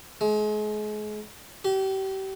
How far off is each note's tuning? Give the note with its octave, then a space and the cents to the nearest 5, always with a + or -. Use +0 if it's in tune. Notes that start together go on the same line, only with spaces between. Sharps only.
G#3 +35
G4 -35